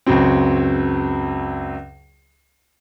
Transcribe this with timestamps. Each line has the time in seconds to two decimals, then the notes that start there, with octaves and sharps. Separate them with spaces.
0.06 C#2 F#2 C#3 F#3 C4